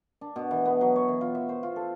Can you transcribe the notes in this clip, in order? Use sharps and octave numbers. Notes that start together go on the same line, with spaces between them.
D4
B2
E3
B3
F#3
C#5
E3
F4
E5
C5
F4
A4